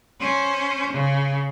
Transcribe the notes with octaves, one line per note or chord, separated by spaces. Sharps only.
C#4 C5
C#3